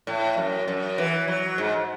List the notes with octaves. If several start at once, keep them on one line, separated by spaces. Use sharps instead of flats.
A2
F#2
F#2
E3
F#3
G#2